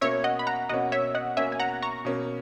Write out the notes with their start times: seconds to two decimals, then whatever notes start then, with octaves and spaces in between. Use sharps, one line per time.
0.01 B2 A#3 C#4 C#5 E5
0.24 D#5 F#5
0.39 B5
0.47 F#5 A#5
0.69 B2 A#3 C#4 D#5 F#5
0.92 C#5 E5
1.15 D#5 F#5
1.37 B2 A#3 C#4 E5 G#5
1.52 G#5
1.60 F#5 A#5
1.82 A#5 C#6
2.05 B2 A#3 C#4